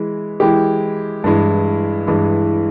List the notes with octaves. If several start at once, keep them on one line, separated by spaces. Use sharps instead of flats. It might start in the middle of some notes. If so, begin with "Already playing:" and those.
Already playing: E3 G#3 E4
E3 G#3 E4 G4
G2 E3 G#3 E4
G2 E3 G#3 E4